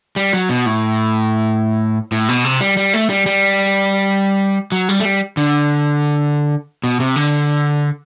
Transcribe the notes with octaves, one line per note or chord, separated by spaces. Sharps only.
G3
F#3
B2
A2
A2
B2
C3
G3
G3
A3
G3
G3
F#3
G3
A3
G3
D3
B2
C3
D3